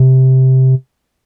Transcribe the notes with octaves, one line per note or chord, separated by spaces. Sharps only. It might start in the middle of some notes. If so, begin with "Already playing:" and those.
Already playing: C3